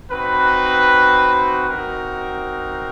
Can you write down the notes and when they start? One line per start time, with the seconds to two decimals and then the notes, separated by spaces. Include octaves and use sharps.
0.11 C4 D#4 F#4 B4
1.69 C4 D#4 F#4 A#4